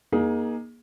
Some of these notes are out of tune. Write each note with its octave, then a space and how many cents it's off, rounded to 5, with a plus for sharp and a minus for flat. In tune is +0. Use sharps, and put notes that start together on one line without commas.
A#3 +25 D#4 +0 G#4 +0